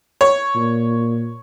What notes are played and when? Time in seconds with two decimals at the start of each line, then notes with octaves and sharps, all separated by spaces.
0.21 C#5
0.55 A#2